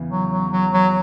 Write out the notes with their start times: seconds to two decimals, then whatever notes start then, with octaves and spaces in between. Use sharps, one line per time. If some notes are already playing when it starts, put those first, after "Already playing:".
Already playing: E2 C#3 E3 B3
0.10 F#3
0.31 F#3
0.52 F#3
0.73 F#3